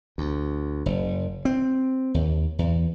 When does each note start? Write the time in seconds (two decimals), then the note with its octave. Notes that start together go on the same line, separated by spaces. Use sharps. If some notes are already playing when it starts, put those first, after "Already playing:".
0.18 D2
0.86 F#1
1.45 C4
2.14 D#2
2.59 E2